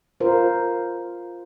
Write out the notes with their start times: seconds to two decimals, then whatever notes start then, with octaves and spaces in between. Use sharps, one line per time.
0.20 F4 A#4 C5